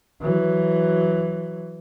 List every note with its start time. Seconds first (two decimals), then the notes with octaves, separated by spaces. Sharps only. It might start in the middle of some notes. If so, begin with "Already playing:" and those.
0.22 E3 F#3